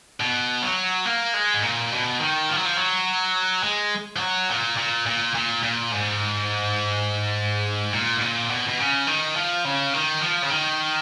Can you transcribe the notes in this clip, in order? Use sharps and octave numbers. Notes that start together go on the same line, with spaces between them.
B2
F#3
A#3
G#3
G#2
A#2
B2
D#3
F3
F#3
F3
F#3
G#3
F3
F#3
A#2
A#2
A#2
A#2
A#2
G#2
A#2
G#2
A#2
B2
B2
C#3
D#3
F3
C#3
D#3
F3
C#3
D#3